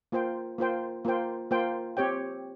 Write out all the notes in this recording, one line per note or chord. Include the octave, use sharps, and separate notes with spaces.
A#3 F4 C5 G5
A#3 F4 C5 G5
A#3 F4 C5 G5
A#3 F4 C5 G5
C4 G4 C#5 G5